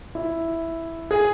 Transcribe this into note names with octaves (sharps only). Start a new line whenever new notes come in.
E4
G#4